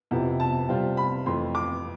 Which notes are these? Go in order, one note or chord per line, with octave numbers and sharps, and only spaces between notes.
F2 C3 F3 B3 E4
A5
C3 G3 C4 F4
B5
F2 E3 A3 C6
D6